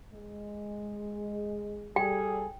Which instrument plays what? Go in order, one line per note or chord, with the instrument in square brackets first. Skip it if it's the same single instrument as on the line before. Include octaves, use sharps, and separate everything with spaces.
[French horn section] G#3
[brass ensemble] G3 G#4 A4 [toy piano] G5